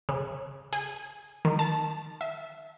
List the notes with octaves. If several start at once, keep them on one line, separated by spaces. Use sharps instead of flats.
C#3
G#4
D#3
A5
E5